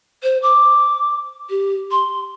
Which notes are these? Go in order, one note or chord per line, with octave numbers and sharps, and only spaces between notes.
C5
D6
G4
C6